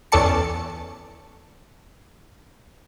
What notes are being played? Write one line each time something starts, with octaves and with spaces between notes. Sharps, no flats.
E2 C#4 A4 D5 A5 C#7